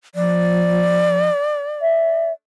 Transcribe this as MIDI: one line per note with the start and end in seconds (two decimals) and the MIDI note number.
0.15 1.29 53
0.15 2.29 74
1.82 2.33 76